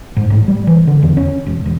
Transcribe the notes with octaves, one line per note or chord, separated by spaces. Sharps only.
G#2
A1
G3
E3
D3
E2
C#4
E1
E1